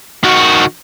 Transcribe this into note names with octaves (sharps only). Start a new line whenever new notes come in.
D#3 F#4